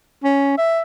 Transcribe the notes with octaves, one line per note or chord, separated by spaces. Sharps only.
C#4
E5